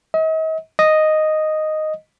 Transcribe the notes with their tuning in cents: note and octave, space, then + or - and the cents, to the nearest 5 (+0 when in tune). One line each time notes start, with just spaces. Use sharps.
D#5 +40
D#5 -5